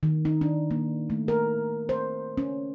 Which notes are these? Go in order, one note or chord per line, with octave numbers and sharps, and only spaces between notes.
D#3
D#4
D4
A#3
A3
A#4
C5
C#4